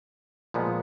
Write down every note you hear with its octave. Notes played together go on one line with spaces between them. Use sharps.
A#2 F3 G#3 B3